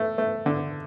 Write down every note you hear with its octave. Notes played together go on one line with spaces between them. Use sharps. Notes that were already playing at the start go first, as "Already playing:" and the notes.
Already playing: A3
A3
D3